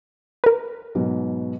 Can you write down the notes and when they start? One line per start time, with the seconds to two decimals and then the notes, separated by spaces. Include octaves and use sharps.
0.44 A#4 B4
0.95 G#2 B2 F#3